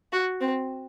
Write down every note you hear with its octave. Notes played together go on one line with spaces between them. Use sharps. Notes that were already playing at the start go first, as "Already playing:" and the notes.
F#4
C4